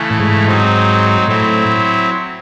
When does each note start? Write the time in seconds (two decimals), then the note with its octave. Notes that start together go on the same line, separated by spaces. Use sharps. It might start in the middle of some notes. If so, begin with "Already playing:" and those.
Already playing: C#3 E3 A3
0.10 A2
0.20 G#2
0.46 F#3 C4 D#4
1.28 A2 F#3 C4 E4